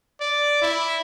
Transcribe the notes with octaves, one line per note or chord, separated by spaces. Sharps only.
D5
E4